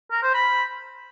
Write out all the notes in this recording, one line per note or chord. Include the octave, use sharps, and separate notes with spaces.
A#4
C5
B5